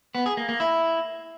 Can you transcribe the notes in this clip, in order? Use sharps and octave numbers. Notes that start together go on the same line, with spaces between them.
B3
G#4
A#3
A#3
E4